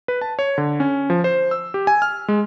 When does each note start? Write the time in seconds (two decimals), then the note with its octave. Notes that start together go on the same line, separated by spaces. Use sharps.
0.08 B4
0.21 A5
0.39 C#5
0.58 D3
0.80 C#4
1.10 F3
1.24 C5
1.51 E6
1.74 G4
1.87 G#5
2.02 F6
2.28 G#3